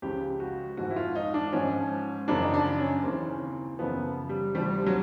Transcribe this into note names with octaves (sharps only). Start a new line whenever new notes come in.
C#2 C#3 F3 G4
F#4
G#2 F3 F#4
E4
F4
D#4
D4
G#2 F3 C#4
F#2 C#3 F3 D4
D#4
D4
D4
C#4
D#2 C#3 E3 C4
F#2 C#3 F3 B3
G3
D2 C3 F3 G3
F#3